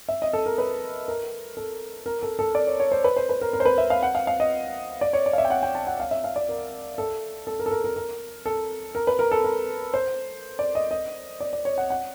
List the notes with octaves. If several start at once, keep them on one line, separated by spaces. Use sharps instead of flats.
E5
D#5
A4
A#4
B4
A#4
A4
A#4
A4
A4
D5
C#5
C#5
C5
B4
C5
B4
A#4
A#4
C5
B4
E5
F5
F#5
F5
F5
D#5
D5
C#5
D5
F5
E5
G5
F#5
G5
A5
F#5
F5
E5
F5
D5
A#4
A4
A4
A#4
A4
A#4
A#4
A#4
A4
A#4
B4
A#4
A4
A#4
C5
D5
D#5
D#5
D5
D5
C#5
F#5
F#5